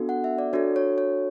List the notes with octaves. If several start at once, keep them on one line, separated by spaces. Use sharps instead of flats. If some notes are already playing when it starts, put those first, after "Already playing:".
Already playing: B3 D4 F#4 A4
F#5
E5
D5
D4 F#4 A4 C#5
C#5
C#5